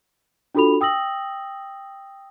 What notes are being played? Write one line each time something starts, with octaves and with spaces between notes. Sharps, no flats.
D4 F4 F#4 A4 B5 F7
G5 D#6 E6 A#6 F#7